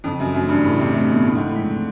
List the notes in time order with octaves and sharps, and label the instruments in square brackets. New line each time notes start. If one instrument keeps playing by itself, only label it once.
[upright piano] F2 [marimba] C#3
[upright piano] F#2
[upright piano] F#2 [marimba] E3 A3 D4
[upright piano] G2
[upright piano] A2 [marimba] C#3
[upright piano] C3
[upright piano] C3 [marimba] E3 A3 D4
[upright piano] B2
[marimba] F2 [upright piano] A2
[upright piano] G#2
A2
[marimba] C3 F3 G#3 C4